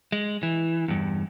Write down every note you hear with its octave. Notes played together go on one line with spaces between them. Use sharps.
G#3
E3
E2 G2